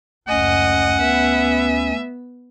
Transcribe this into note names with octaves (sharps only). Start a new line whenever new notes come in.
F#1 D2 C#4 D#5 F#5 G#5
B3 E5